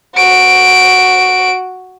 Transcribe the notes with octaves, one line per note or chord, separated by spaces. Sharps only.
F#4 D7